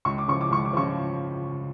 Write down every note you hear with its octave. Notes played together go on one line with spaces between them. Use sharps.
C#2 C#6
D6
C#3 F3 C#6
D6
C#2 C#6
D6
C#3 F3 C#6